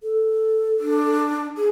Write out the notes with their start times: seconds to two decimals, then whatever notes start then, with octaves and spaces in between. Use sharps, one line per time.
0.03 A4
0.80 D4
1.57 G#4